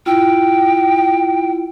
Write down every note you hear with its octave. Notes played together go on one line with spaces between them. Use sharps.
E4 F4 G5